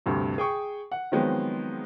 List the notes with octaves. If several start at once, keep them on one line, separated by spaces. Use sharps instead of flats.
D2 G2 C3
G#4 G5 C#6
F#5
D#3 F3 F#3 G#3 B3 C4